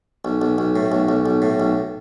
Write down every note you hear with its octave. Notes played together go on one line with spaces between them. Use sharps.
B1
B1
B1
A2
B1
B1
B1
A2
B1